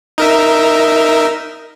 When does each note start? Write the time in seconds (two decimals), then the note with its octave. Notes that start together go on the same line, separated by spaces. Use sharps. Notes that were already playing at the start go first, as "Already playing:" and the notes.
0.18 D#4 A#4 E5